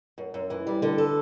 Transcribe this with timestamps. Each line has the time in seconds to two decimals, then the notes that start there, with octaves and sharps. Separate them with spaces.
0.18 F#2
0.34 F#2
0.50 E3
0.67 G3
0.82 D3
0.98 A4